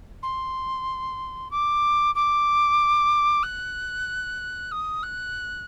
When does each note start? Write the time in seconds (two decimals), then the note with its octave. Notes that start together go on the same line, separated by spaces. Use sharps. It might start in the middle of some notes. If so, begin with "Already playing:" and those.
0.23 C6
1.51 D6
2.15 D6
3.43 F#6
4.71 D#6
5.03 F#6